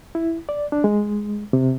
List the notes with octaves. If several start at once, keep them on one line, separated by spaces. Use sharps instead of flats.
E4
D5
D4
G#3
C3